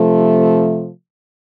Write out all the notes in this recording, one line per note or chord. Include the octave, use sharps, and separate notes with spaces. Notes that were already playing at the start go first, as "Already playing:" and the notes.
Already playing: C3 F3 A3